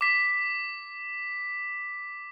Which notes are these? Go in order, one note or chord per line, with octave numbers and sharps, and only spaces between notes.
D6 B6